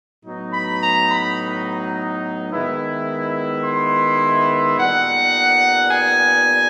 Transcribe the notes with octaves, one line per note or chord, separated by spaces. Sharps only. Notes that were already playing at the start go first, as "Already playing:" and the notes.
A2 F#3 B3 D#4
B5
A#5
B5
D#3 G#3 B3 E4
C6
A#2 G3 B3 D#4 F#5
G#5